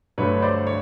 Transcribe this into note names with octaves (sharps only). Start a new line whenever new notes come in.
G2 D3 F#3 A3 B4 C#5
C5 D5
C#5